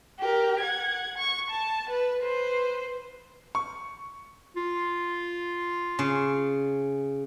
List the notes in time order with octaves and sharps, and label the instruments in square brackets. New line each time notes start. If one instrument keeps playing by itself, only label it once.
[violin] G4 A#4
F#5 G#6
C#6
A5
B4
B4 C5
[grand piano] C#6
[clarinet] F4
[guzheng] C#3